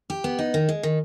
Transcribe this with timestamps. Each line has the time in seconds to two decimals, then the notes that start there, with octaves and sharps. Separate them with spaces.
0.10 G4
0.24 B3
0.39 D#4
0.54 D#3
0.69 G#3
0.83 D#3